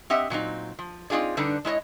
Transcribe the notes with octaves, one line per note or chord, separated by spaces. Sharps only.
C4 G4 D#5 E5 F#5
A#2 F#3 C4 D#4
F3
C4 D#4 F4 G#4 D5
D3 G3 D4 D#4 B4
G#3 E4 C#5 D#5